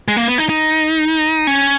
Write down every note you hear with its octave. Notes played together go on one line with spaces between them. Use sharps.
G#3
A#3
B3
D#4
D#4
C#4